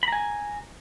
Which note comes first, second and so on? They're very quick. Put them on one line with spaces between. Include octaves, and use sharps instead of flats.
B5 A#5 G#5